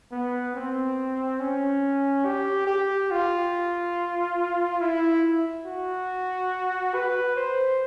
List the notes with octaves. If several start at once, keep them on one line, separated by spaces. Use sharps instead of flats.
B3
C4
C#4
G4
G4
F4
E4
F#4
B4
C5